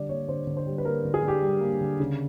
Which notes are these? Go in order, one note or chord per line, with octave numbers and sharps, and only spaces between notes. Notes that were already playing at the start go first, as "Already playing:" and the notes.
Already playing: D3 G3 D5
A#3 C#5
D3 C5
D3
C5
G3
B4
A#3 A#4
D3
G#4
D3 G4
G3
A#3
D3
C#3